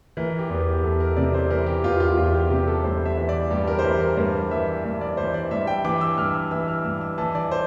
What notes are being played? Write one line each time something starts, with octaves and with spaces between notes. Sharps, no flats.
E3 A#4
G4
E2
G4
E2 A4
A#4
C3 D5
C5
E3 A#4
G4
E2 F4
F4
E2 F4
G4
C3 G4
A4
G2 C5
E5
E3
D5
G2 G4
A#4
C5
E3 A#4
A#4
G2 C5
E3 E5
G2 E5
D5
E3 C5
D5
G2 E5
G5
E3 D6
E6
G2 F6
E6
E3 E6
F6
G2 E6
E6
E3 A5
D5
C5